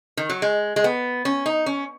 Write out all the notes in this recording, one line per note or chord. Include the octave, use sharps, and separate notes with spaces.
D#3
F#3
G#3
G#3
B3
C#4
D#4
C#4